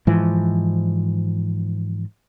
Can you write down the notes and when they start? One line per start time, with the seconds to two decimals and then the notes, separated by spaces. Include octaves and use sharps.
0.07 G#2 E3 F3